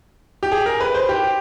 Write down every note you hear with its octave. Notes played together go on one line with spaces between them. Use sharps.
G4
G#4
A#4
B4
C5
G4